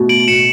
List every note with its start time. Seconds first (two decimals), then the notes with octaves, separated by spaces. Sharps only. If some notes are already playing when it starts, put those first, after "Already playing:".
Already playing: B2 A3
0.09 D7 F#7
0.28 B2 C#7 E7